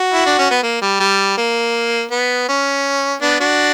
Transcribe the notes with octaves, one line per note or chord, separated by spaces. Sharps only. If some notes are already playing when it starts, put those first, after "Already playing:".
Already playing: F#4
E4
D4
C#4
B3
A#3
G3
G3
A#3
B3
C#4
B3 D4
D4 F#4